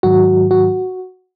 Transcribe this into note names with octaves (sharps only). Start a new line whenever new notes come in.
G#2 D#3 F#3 F#4
F#4